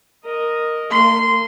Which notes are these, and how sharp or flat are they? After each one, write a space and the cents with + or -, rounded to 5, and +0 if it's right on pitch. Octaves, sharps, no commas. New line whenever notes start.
A#4 +0 D#5 +0
A#3 -40 C6 -15